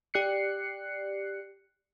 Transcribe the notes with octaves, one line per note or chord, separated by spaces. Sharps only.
G4 D5 F#6 C7 C#7